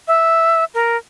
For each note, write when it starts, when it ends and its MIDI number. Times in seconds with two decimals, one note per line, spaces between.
0.08 0.64 76
0.74 0.97 70